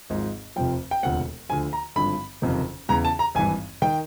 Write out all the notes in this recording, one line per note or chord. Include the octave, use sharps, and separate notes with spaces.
G#1 G#2 F3
F1 F2 C3 F3 G5
G5
E1 D2 C3 F3 F#5
D2 D3 F3 G#5
A#5
G#1 G2 D3 F3 B5
F#1 F2 C3 D#3
E2 C#3 E3 A#5
A5
A#5
G#1 G2 E3 G#5
D#3 G5